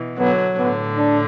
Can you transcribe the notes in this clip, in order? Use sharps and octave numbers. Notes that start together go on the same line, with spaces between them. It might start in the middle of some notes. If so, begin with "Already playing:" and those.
Already playing: B2 E3
D3 F#3 B3
A2 D3 B3
D4